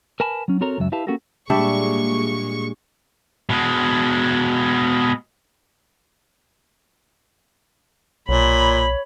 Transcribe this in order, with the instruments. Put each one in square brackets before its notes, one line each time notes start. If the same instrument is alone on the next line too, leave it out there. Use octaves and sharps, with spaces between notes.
[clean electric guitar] A#4 B4 G#5 A5 B5
F#3 C#4
C4 F#4 A4 A#4 C#5 A#5
C#2 F#2 F#3 E5
E4 G4 B4 E5 F5 A5
A#3 C#4 F#4 G4 A4 A#4
[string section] A#2 G#3 C#6 [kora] G3 D4 E5
[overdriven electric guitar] B2 G#3
[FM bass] B1 [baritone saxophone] A#2 [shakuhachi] C#5 [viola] B5